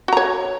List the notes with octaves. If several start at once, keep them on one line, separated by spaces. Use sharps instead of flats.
F#4 C#5 A#5